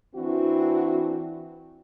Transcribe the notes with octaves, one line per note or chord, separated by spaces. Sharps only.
E3 C4 D4 E4 F#4